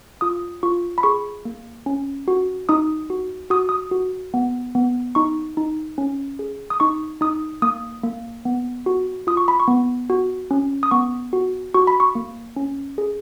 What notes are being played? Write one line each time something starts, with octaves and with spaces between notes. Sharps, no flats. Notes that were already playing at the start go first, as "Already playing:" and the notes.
F4 D#6
F4 C#6
B5
G#4 C#6
A#3
C#4
F#4
D#4 D#6
F#4
F#4 D#6
D#6
F#4
B3
B3
D#4 C#6
D#4
C#4
G#4
D#6
D#4 C#6
D#4 D#6
A#3 D#6
A#3
B3
F#4
F4 D#6
C#6
B5
C#6
B3
F#4
C#4
D#6
B3 C#6
F#4
F#4 C#6
B5
C#6
A#3
C#4
G#4